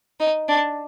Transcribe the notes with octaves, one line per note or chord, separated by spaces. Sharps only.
D#4
D4